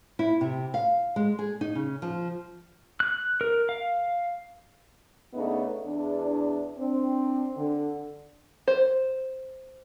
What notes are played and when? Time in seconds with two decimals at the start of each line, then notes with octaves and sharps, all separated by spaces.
0.19 E4
0.41 C3
0.74 F5
1.16 G#3
1.39 G#4
1.61 D#4
1.75 C#3
2.02 F3
3.00 F#6
3.41 A#4
3.69 F5
5.34 C#3 A3 B3 D4 D#4
5.84 E2 D4
6.78 C4 D4
7.57 D3
8.68 C5